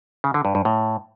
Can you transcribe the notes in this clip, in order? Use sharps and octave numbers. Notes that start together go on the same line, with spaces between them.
C#3
D3
G2
G2
A2